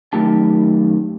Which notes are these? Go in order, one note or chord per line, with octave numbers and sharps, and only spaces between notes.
F#2 D#3 A3 G4 A5